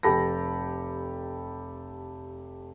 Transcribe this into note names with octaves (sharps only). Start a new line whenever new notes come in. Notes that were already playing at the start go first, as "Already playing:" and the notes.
F1 G4 A4 B5 A#6